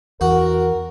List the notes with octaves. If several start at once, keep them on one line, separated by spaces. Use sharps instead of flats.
E2 F#4 A#4